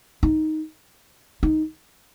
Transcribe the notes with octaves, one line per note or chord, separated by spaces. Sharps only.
D#4
D#4